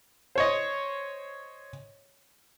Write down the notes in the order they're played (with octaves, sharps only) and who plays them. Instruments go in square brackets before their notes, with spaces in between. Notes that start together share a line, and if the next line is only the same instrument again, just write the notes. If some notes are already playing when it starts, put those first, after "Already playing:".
[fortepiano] C5 C#5 D#5